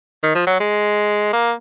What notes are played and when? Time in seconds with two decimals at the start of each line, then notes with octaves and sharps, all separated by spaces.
0.23 D#3
0.35 F3
0.47 F#3
0.60 G#3
1.33 A#3